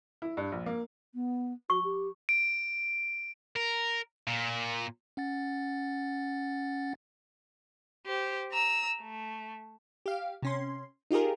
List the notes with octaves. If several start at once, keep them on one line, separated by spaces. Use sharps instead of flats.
E4
G2
A#1
A#3
B3
F#4 C#6
G4
D7
A#4
A#2
C#4 F#5 A6
G4 C5
A#5 E6
A3
G4 F5
C3 C#4 C6
D#4 F4 G4 G#4 A#4